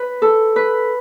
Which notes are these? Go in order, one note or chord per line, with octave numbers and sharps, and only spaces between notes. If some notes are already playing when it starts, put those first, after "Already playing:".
Already playing: B4
A4
B4